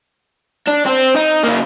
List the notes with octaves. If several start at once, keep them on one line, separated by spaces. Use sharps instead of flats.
D4
C4
D#4
C#3 A#3